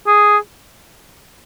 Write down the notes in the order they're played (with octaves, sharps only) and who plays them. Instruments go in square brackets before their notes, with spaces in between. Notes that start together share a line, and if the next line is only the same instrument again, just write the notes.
[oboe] G#4